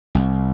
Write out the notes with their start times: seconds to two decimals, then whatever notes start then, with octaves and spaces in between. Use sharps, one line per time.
0.15 C2